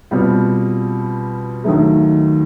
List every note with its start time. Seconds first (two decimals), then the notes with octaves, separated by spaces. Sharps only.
0.11 B2 G3 C4 F4
1.64 D#2 D#3 F#3 A3